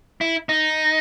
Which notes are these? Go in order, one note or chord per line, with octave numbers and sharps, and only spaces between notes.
E4
D#4